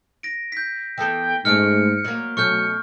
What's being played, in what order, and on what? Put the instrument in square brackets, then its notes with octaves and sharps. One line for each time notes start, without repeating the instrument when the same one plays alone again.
[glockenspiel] A#6 D7
G6 B6
[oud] E3 B3 A4 [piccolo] G5
[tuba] G#2 [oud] G#3 A3 C#4 [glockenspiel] F6 D7 [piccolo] C#7
[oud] F#3 A#3
[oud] B2 A3 C#4 [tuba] F#3 [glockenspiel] C#6 F6 G6 [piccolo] C#7